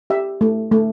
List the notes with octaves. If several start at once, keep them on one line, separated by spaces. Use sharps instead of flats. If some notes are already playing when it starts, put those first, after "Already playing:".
G4 E5
A3
A3